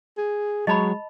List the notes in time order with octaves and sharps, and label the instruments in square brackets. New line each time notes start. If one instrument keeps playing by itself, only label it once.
[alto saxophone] G#4
[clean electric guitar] F#3 C#5 [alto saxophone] G#3 [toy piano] D#5 A5 B5